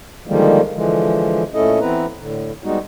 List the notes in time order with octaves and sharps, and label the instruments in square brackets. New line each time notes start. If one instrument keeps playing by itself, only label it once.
[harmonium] D3 D#3 F3 G3 G#3 A#3
D3 E3 F3 G#3
A#2 A3 C#4 E4 A4 D#5
E3 B3 C4 E4 B4 A#5
A2 D3
G3 G#3 B3 D#4 F#4